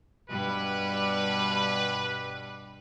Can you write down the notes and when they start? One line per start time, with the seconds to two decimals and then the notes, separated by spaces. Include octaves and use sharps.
0.30 G2 B2 G3 B4